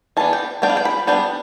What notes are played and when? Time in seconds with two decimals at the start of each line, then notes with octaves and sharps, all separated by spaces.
0.17 E3 B3 D4 A5
0.33 G5
0.62 G3 B3 D4 G5
0.70 F5
0.77 G5
0.85 B5
1.07 G3 B3 D4 G5